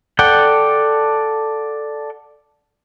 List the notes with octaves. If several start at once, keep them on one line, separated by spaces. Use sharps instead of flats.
A4 D5 F#5 G5